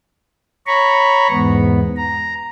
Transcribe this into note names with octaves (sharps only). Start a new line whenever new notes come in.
C#5 A#5 B5 C#6
E2 G#2 B3
A#5